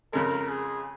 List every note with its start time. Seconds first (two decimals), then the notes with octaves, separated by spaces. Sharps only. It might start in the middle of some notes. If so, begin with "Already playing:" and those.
0.13 F2 C#3 G#3 A#4
0.49 G#4